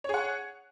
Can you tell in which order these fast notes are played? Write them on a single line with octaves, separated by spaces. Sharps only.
C#5 G#4 F#5